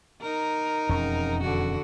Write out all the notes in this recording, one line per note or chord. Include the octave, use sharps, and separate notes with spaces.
D#4 A#4
E1 F2 C#4
D3 F#4